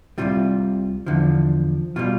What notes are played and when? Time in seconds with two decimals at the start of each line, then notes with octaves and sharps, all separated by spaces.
0.18 C2 C3 G3 F4
1.06 E2 D3 F3
1.96 B2 G3 F4